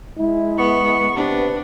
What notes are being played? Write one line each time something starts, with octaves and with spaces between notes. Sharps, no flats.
G#3 E4
B3 C#6
C3 B3 D4 B4